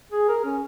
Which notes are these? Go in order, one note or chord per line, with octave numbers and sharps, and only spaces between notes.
G#4
A#4
C#4